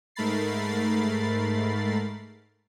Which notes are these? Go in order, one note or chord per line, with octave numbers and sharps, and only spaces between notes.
G#2 A3 A#4 B5 A6 C7